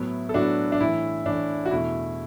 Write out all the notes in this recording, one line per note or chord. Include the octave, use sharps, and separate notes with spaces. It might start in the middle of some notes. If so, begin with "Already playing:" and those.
Already playing: A2 F#3 B3 E4
A4
A2 F#3 B3 D4 F#4
D4
A2 E3 A3 E4
A2 E3 A3 D4
F#4
E2 B2 A3 E4